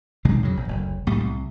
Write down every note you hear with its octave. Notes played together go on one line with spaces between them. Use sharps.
B1 C3 D#3 G#3
F2 C#3 F#3
A#1
F#1 D2
B1 A2 G3 A3
C2